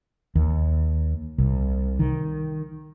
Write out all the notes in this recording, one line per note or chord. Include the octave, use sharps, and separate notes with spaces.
D#2
C2
D#3